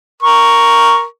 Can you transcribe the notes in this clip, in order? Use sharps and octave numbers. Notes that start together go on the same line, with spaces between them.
A#4 C#6